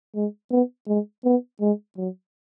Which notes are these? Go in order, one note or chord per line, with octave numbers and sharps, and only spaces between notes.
G#3
B3
G#3
B3
G#3
F#3